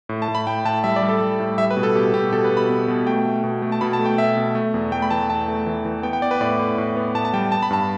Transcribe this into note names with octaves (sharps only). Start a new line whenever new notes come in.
A2
A5
A2
B5
A2 G5
A2 A5
G3 E5
D5
G3
A4
G3
A2
G3 E5
B4
B2
A4
B2 G4
B2 G4
B2 A4
B4
B2
B5
B3
B2
A3 G5
A3
B2
A3
A5
B2 B5
A5
A3
G5
B2 E5
B2
A3
E2
A3 G5
B5
E3 A5
E2 A5
A3
E3
E3
B3 G5
G5
B3 D5
B4
A2 D5
A2
A2
B3
A2 A5
A5
G3 G5
B3 A5
B5
G2 A5